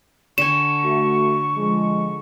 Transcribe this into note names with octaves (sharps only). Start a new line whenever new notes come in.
D3 G#5 C#6 E7
A3 F#4
F3 G#3